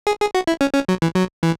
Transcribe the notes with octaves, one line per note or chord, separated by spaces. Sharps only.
G#4
G#4
F#4
E4
C#4
C#4
F#3
E3
F#3
E3